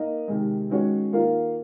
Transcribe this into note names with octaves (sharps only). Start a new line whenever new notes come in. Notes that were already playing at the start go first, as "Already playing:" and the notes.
Already playing: A#3 D#4 A#4 D#5
C3 D#3 G#3
D#3 G#3 C#4 F#4 C#5
D#3 A#3 F4 A#4 F5